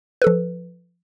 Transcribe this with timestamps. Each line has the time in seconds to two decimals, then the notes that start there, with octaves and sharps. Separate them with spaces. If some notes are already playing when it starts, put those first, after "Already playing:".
0.22 B4
0.24 A4
0.27 F3